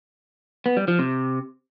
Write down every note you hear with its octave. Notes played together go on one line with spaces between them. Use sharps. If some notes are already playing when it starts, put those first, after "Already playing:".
B3
G3
F3
C3